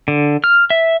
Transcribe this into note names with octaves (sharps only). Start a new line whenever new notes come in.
D3
F6
E5